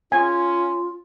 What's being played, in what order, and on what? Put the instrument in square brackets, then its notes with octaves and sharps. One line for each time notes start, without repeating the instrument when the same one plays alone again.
[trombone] C#4 [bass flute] F4 [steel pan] G#5